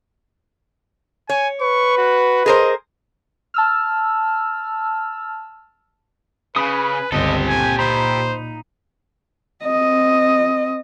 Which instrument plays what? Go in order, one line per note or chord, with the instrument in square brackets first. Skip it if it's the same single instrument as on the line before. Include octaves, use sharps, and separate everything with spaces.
[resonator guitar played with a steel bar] C#5 [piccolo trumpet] G#5
[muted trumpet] B4 [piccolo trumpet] C#6
[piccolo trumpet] F#4
[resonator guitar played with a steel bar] G#4 A#4 C5 [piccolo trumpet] D#5
[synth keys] A5 E6 F6
[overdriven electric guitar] C#3 [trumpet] B4 [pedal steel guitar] G#5 B5 D#6
[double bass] G1 C#2 [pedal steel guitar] C4 [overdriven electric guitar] G4 A4 [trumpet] D#5
[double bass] A#2 [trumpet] G#5
[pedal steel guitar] D#4 A#5 B5 [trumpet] C5
[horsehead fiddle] C4 D#5